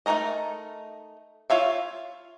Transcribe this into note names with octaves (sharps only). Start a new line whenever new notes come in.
A3 B3 D#4 A#4 D#5
F4 C#5 E5 F5